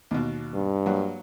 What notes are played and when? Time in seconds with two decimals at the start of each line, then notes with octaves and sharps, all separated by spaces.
0.11 D#2 B2
0.54 G2
0.86 F#3 A#3 F#4